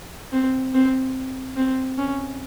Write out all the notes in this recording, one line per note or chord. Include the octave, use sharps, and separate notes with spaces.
C4
C4
C4
C#4